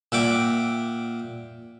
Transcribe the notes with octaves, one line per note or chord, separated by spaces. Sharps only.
A#2 E5 F#5 G5 D6